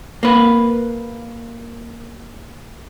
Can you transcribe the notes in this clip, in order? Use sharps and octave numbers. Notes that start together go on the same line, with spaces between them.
A#3 B4